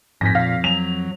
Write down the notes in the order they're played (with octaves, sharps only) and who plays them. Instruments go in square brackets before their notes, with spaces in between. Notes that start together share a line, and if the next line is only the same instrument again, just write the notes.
[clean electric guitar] F2 [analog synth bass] G#2 [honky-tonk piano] A#6 B6
[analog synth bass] A#2 [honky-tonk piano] F5
[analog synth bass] F#3 [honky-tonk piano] F7